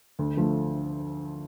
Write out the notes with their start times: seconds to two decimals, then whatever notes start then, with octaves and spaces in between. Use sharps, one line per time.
0.19 D2
0.36 D3 F3 A3